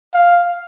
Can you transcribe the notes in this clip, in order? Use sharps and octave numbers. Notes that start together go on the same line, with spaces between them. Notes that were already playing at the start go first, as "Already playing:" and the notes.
F5